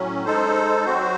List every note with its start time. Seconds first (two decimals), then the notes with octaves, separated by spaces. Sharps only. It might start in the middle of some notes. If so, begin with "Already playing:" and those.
Already playing: A2 F#3 C#4
0.25 G#3 D#4 A4 C5
0.85 F#3 C4 F#4 C5